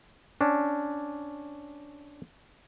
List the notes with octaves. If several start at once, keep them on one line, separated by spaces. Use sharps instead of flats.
C#4 D4